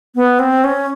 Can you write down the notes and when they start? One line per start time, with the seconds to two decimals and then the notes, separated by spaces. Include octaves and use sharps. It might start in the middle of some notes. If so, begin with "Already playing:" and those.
0.15 B3
0.39 C4
0.64 C#4